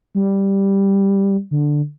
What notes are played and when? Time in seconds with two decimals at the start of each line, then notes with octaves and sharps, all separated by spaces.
0.15 G3
1.51 D3